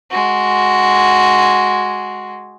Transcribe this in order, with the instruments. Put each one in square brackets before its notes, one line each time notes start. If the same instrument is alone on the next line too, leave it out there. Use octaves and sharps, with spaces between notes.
[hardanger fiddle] G#3 F#4